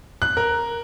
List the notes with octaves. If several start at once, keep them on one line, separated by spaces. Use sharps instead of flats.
F#6
A#4